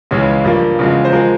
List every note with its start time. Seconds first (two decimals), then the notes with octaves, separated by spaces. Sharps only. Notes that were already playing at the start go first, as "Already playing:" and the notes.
0.11 C#2 C#3 E3 G#3 C#4
0.44 G2 F3 A#3
0.79 E2 C#3 F3 G#3
1.05 C5
1.12 F3 G#3 A#4